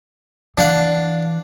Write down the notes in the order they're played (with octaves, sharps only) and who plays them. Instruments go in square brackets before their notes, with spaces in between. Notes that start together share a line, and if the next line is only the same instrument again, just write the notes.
[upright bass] E3 [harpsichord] D4 F5 F#5